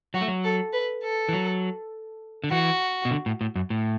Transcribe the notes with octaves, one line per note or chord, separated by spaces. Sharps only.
F#3 F#4
A3
F#3
A4
B4
A4
E3
F#3
D3
E3 F#4
B2
D3
A2
A2
F#2
A2